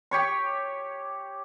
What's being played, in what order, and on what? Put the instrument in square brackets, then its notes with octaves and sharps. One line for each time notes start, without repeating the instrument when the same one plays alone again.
[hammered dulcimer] G4 C#5 C#6